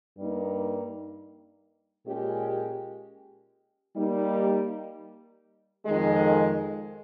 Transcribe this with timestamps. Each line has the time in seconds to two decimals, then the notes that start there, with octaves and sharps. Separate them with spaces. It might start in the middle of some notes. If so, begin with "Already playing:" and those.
0.16 G2 G3 A#3 D#4
2.06 A#2 G#3 C#4 G4
3.95 G3 A#3 D#4
5.85 F2 D#3 G#3